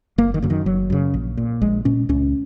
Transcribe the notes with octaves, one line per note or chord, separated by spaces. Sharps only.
F#1 A#3
D#3
F#2 C#3
D#3
F#1 F#3
F#2 C#3
A#1
A#2
A#1 G#3
A#2 C#4
C#2 C#4